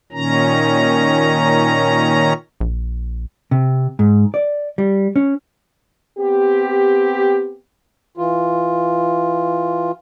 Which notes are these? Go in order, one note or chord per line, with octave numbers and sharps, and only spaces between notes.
A#2 D#3 C#4 A#5
A#1
C3
G#2
D5
G3
C#4
B3 C4 G4
E3 F4